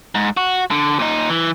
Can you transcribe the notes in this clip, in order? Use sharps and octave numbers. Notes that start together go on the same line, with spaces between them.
G#2
F#4
D3
A#2 D#4
E3